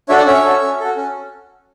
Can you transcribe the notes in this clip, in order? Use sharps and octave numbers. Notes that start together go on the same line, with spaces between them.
D4 F#4 A4 C#5 E5
D5 F#5
C#4 C#5 E5
F#4 A4
C#4
F#4 A4
C#4